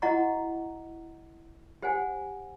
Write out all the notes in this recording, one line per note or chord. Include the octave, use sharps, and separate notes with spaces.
E4 F#4 D#5 F#5 A#5 C#6
G4 C5 F#5 G#5